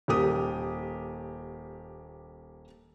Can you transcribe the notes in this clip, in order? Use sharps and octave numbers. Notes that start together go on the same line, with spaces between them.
D#1 A#3 G4 D#6